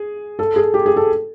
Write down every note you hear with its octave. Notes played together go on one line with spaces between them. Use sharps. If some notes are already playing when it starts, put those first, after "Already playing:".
Already playing: G#4
A4
G#4
G4
G#4
A4